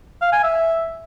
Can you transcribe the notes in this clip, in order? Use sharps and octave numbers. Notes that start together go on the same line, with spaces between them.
F5
G#5
E5